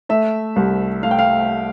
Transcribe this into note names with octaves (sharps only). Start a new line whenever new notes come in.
A3 E5
C2
A3 F5
G5
F5